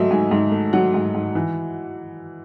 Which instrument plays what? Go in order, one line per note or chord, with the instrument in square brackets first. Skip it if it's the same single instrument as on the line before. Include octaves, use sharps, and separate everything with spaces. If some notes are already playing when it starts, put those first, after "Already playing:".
Already playing: [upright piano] G#2 F#3 A3 D#5 E5
G#2 G#5
G#2
A3
F#3 F#5
G#2
G#2
E3